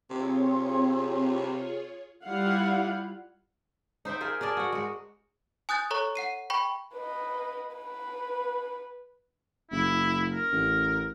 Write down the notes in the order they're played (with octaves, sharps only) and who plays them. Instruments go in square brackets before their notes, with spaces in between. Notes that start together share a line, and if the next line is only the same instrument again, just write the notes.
[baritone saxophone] C3 [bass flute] C4 [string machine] F4 G#4 C#5
[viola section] G3 E4 F4 F5 F#5
[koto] D#4 C5 E5 G5
F4 G#4 A#4 E5
G#4 A#4 D5 A5
F#4 F#5
G#3 F#4
[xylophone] G#5 D#6 F#6 G6 A6
A4 C#5 A#5 C#6 F#6
F#5 C7 D#7
G5 B5 C#6
[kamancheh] B4 D#5
B4
[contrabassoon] F#1 [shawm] E4
[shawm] A#4
[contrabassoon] A1